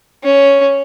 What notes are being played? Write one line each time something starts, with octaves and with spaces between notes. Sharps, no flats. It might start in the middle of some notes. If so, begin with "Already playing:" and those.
C#4